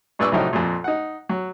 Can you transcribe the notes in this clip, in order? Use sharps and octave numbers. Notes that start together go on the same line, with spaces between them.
G2 A#2 B4 D5 C#6 E6
C2 A2 F3 F#3 D#4 G5
F2 A#2
D#4 F#5
F#3